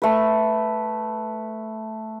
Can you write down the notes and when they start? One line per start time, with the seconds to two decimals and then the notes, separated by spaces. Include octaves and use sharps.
0.02 A3 B4